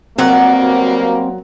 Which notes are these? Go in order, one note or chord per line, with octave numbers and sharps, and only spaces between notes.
B2 F#3 G3 A#3 C4 D5 F#5